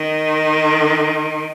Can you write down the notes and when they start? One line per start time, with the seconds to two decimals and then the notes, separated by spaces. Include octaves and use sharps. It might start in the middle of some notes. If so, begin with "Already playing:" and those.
Already playing: D#3